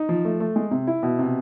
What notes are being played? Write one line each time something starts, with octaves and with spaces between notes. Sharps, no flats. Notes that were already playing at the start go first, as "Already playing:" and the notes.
Already playing: D#4
F3
A3
A3
G#3
C3
E4
B2
C3